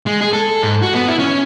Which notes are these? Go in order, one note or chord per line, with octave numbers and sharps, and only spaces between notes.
G#3
G#4
A4
G#2
F#4
B3
E4
C#4